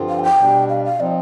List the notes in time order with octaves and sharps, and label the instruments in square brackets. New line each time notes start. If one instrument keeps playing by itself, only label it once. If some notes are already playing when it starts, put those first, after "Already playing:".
Already playing: [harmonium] G2 D3 F3 C4 F4
[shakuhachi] F5
G#5
G5
[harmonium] B2 G3 D4
[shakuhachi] F5
F5
[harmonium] F3 C4 D#4 [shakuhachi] D5